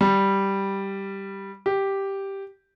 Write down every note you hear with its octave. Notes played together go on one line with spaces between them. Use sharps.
G3
G4